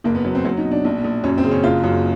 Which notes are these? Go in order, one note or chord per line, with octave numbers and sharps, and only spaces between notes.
F#1 A#3
B3
F#3
C4
F#3 C#4
D#4
B2
D4
A#1 D4
A#1
F#2 C#4
C4
C#3
C#4
F#1 F4
F#2